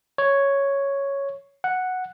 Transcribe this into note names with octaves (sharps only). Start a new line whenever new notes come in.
C#5
F#5